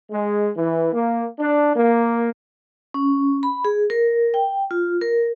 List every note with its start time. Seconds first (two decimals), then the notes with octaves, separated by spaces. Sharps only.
0.10 G#3
0.56 E3
0.93 A#3
1.39 D4
1.76 A#3
2.94 C#4
3.43 B5
3.65 G#4
3.90 A#4
4.34 G5
4.71 F4
5.02 A#4